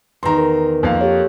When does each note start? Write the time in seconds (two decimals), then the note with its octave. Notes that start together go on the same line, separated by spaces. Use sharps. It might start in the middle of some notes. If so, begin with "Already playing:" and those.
0.23 E2 D#3 A#5 C6
0.38 A#4
0.83 F2 A#3 F5
1.01 G4 A4 C#5